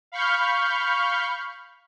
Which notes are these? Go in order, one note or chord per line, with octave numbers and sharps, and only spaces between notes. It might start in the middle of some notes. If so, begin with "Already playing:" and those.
F5 B5 C#6 F6 G6